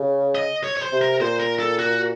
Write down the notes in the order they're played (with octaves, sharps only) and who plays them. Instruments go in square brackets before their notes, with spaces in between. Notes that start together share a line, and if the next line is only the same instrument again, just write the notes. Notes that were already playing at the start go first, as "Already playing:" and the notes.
Already playing: [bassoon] C#3
[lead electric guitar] D#5
C#5
C#5
C5
[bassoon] C3
[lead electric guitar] A#4
[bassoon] A#2 [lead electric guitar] C5
[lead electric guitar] A#4
A4
F#4